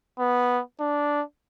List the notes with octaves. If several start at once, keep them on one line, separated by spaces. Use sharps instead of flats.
B3
D4